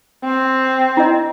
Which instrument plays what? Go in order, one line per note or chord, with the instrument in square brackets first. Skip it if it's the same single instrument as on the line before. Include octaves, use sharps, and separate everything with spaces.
[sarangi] C4
[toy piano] E4 D#5